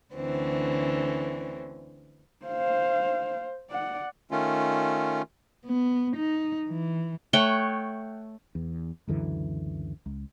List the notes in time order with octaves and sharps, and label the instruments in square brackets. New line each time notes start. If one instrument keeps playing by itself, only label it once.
[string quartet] D2 D3 E3 C4 C#4
[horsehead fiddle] C5 F5
D5 F#5
[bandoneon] D#3 A3 C#4 F4
[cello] B3
D#4
E3
[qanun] A3 C#5 F#5 G5
[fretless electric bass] E2
C#2 F#2 D3 E3
C#2